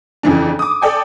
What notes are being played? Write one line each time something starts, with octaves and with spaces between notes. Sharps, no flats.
F2 C#3 E3 D4
D6 D#6
A4 D5 G5 G#5